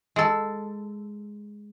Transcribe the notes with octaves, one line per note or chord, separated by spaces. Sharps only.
G#3 A4